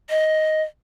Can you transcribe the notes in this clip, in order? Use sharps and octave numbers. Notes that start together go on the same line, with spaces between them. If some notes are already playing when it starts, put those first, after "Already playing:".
D#5